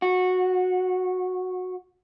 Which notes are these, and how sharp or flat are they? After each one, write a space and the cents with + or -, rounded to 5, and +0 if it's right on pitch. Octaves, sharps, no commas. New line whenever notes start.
F#4 -15